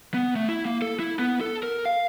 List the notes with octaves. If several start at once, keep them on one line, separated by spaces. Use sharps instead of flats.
B3
A3
E4
A#3
A4
E4
B3
A4
A#4
F5